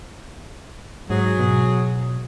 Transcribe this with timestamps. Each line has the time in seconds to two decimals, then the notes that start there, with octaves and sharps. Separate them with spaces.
1.10 G#2 F#3 G#4
1.39 B2